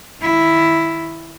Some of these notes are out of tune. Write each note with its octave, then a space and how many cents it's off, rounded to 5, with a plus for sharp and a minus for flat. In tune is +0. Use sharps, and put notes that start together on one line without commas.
D#3 +0 E4 +0